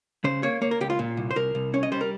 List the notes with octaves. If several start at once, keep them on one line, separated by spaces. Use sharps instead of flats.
C#3 C5
A#3 C#5
A#3 C#5
A#4
C#2 G4
F4
A#2
C2
C5
C2 A#4
C2
C#4 C#5
D#5
G3 C5
A#4